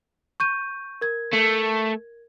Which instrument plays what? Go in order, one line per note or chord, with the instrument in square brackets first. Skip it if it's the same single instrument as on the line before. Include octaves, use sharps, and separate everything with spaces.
[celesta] C#6 G6 D#7
A#4 G#6
[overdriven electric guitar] A3